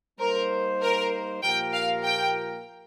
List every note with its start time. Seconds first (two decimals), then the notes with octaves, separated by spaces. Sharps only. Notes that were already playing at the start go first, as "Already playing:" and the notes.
0.19 G3 A#3 D#4 A#4 C5
0.81 A#4
1.42 A#2 F3 A#3 G4 A#4 G5
1.73 F5
2.04 G5